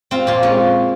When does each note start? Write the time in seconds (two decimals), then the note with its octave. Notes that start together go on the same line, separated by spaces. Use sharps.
0.11 C4 F4
0.27 A#2 F4
0.43 G#3 C#4